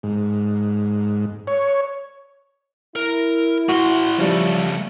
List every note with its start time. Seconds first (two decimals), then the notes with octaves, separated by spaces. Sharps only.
0.03 G#2
1.47 C#5
2.96 E4 A#4
3.69 A2 F#4 C6
4.18 C#3 F3 G3 A3